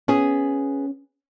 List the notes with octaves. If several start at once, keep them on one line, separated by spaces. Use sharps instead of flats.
B3 C#4 G#4